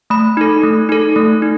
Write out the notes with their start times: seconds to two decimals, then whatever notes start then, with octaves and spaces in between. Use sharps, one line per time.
0.10 A3 B5
0.37 D#4 A4
0.63 A3
0.89 D#4 A4
1.16 A3
1.42 D#4